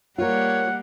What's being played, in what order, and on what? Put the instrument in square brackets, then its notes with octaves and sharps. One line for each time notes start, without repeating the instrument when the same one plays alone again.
[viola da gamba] G3 A#3 [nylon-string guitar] F4 A#4 [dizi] C#5 [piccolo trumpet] F#5